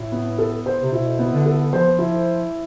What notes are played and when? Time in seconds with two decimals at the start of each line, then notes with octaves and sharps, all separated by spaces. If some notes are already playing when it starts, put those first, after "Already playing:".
Already playing: A2 E4
0.12 B3
0.38 A4
0.66 C5
0.83 C3
0.92 B2 E4
1.19 B3
1.32 D3
1.46 A4
1.73 F3 C5
1.99 E4